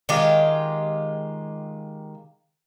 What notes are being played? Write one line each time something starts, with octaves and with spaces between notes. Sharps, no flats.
D#3 G#3 F4 G4